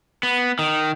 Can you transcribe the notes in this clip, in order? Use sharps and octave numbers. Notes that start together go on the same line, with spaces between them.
B3
D#3